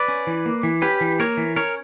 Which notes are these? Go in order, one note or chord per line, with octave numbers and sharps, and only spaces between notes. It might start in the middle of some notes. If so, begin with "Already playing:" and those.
Already playing: B4 D5
C#4
E3
A#3
E3
C#4 G4 B4
E3
A#3 A#4 C#5
E3
C#4 A#4 C#5